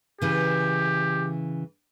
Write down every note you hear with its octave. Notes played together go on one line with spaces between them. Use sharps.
C#3 E3 G4